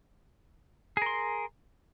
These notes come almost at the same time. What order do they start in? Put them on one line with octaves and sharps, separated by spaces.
G#4 A#4 C6